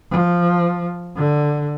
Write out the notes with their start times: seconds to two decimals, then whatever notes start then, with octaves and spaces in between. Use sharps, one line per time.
0.11 F3
1.16 D3